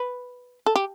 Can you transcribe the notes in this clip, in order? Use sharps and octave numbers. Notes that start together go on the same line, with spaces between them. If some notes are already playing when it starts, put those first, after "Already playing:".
Already playing: B4
A4
G4